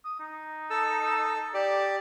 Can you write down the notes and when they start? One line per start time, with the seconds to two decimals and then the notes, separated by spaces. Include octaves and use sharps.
0.05 D#6
0.20 D#4
0.70 A4 E6
1.54 G4 D5